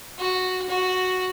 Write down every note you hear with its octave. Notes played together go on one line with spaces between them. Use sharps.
F#4
F#4